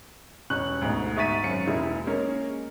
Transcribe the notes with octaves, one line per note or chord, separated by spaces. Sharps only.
E1 C#4 C#6 F#6 F#7
D2 G#2 B2
G#2 E5 C#6 A6 B6 D#7
G#1 F#2 C#7
E1 A#3 E4 G#4
G#3 A#3 C#4 A#4